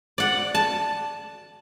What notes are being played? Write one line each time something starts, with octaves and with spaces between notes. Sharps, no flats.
D5 F#5
A5